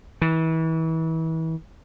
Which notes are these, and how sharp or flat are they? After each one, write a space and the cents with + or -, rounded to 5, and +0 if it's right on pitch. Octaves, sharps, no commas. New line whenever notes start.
E3 -30